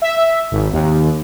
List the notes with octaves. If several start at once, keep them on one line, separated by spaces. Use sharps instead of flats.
E5
G#1
D#2